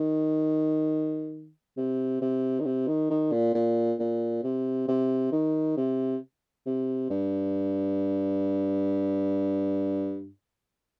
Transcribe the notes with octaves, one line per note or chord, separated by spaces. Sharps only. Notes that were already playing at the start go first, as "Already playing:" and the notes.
Already playing: D#3
C3
C3
D#3
C3
D#3
D#3
A#2
A#2
A#2
C3
C3
D#3
C3
C3
G2